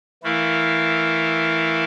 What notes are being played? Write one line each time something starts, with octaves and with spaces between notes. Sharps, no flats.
E3 A3 E4 A#4 F5